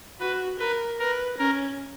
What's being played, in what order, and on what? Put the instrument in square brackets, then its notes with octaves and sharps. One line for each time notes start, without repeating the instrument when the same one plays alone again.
[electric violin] F#4 [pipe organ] B4
[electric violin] A#4 [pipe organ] B4
[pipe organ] A#4 [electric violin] B4
[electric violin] C#4 [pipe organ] A#4